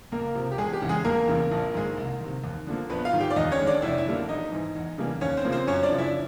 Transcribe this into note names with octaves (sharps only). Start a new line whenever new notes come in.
C#2 A#3 A#4
C3 F3
G4
E1 G#3 G#4
G4
E2 C#3
G#3 G#4
E1 A#3 A#4
E2 C#3
A#1
G#2 D#3 G#3
C2
C3 D#3
D#2
D3 F3 A#3
A#1 B3 B4
F4 F5
G#2 D#3
G4 G5
D5
D#2 D#4 D#5
C#4 C#5
D#3 G#3
D4 D5
F1 E4 E5
E4 E5
F2 D3 G3 A#3
G#1 D#4 D#5
G#2 E3
E2
C#3 E3 G3 A#3
D#2 C#4 C#5
C4 C5
C#3 F3 A#3
C4 C5
F#2 C#4 C#5
D4 D5
C#3 F3
E4 E5